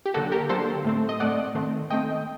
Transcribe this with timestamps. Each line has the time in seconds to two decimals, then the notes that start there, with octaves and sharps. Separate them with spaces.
0.06 G4
0.14 D3 F#3 A#3 F#4 A4
0.32 G4 A#4
0.49 D3 F#3 A#3 A4 C5
0.84 A2 A3 C4
1.09 D#5
1.20 A2 A3 C4 D5 F#5
1.55 D#3 A3 C4
1.90 D#3 A3 C4 D#5 G5